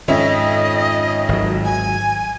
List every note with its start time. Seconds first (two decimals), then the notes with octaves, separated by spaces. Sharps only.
0.08 F2 G#2 D#3 C#4 D#5 E5
1.29 G#1 F#3
1.65 G#5